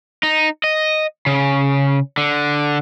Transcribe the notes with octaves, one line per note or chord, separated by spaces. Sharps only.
D#4
D#5
C#3
D3